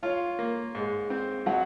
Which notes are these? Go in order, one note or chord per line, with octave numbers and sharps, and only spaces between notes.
F4 C#5 F5
A#3
G#2
C4
F#3 D#5 F#5